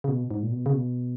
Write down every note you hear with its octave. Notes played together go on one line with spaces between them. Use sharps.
C#3
B2
G#2
A#2
B2
C#3
B2